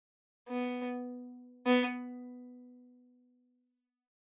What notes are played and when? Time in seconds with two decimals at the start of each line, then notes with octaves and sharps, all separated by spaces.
0.48 B3
1.66 B3